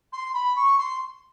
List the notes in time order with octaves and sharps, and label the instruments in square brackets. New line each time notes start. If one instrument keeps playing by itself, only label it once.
[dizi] C6
B5
C#6
C6